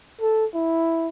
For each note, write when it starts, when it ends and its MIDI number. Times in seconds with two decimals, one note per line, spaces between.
0.21 0.46 69
0.54 1.08 64